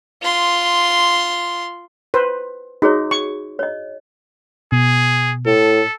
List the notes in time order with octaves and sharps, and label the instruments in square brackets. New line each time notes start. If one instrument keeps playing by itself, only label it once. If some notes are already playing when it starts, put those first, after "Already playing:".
[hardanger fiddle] F4 C6
[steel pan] B4 C5
[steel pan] D#4 [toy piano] F#4 G#4 C#5
[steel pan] C#6
[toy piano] C#5 D#5
[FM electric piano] B2 [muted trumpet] G#4
[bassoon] A2 [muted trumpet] A4